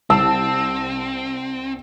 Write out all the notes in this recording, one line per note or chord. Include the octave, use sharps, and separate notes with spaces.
C2 C4 A5 E6